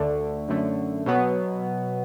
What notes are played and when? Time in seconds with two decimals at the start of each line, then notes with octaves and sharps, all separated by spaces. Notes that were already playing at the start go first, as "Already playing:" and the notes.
Already playing: D2 D3 A3 D4
0.49 F#2 D3 A3
1.06 B2 F#3 B3